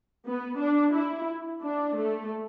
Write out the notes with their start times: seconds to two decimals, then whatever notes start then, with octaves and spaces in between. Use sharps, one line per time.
0.25 B3
0.58 D4
0.93 E4
1.61 D4
1.96 A3